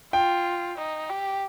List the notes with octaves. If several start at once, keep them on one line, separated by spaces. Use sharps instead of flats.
F4 G5
D#4
G4